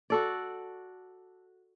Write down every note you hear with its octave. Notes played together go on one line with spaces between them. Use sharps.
F#4 A4 D5